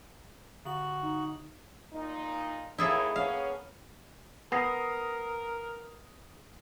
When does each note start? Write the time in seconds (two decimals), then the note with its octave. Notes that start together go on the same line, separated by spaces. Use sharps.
0.65 D3 F#4 F#7
1.02 D#4
1.93 A#2 D#4
2.78 D#2 E4 G#4 A4
3.16 A#3 B3 C#4 F5
4.52 B3 A#4 D#6 A#6 C7